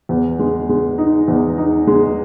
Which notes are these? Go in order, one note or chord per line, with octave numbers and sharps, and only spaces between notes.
E2
G#3
G#3
D#4
E2
D#4
G#3